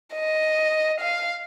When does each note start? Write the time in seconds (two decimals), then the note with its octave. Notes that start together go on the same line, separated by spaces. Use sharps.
0.15 D#5
1.01 F5